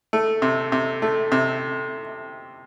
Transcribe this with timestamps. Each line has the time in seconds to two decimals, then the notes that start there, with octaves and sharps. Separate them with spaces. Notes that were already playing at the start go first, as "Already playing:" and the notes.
0.13 A3
0.42 C3
0.72 C3
1.02 A3
1.32 C3